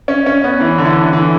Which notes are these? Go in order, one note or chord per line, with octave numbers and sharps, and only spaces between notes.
C#4
C#4
B3
E3
D3
E3
D3
E3